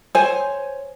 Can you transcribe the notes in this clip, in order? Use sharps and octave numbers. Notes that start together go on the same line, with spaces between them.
C5 C#5 G#5